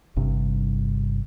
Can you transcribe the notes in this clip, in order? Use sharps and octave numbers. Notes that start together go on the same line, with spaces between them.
G1 G2 C3